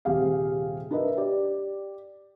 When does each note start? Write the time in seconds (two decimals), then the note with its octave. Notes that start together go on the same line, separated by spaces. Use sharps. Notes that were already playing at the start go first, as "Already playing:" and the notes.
0.05 D#1 C3 G4 G#4 F5
0.91 D4 A#4 B4 D#5 E5
1.17 G4 D5